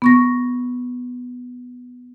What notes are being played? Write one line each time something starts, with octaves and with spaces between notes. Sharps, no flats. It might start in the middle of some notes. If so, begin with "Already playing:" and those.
B3 C#6 A#6